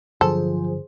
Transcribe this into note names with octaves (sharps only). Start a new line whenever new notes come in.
G2 D3 F3 F#3 G#4 A4 C5